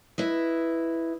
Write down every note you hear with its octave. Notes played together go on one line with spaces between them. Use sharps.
E4 B4 D#5